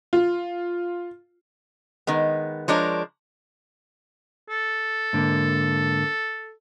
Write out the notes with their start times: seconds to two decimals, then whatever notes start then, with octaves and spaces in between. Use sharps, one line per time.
0.13 F4
2.07 D#3 G#3 B3
2.68 F3 G#3 D4 A#4 C#5
4.50 A4
5.13 G#2 D3 A#3